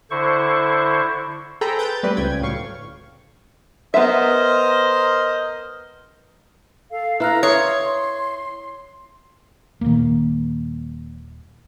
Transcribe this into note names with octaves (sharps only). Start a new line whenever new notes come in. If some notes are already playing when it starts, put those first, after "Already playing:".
D3 E4 C5 C#6
G#4 A4 C5 G5 A#5 B5
B4 G6 A6
G3 A3 C4 B4 D5
C#2 C#3 G5 G#6
D2 A2 F#3 F5 C#6
B3 A#4 C5 D#5 E5
A4 F5
E4 A4 B4 F5 A#5 F6 F#6
C#5 C6 D#6
D#1 A#2 D#3 A#3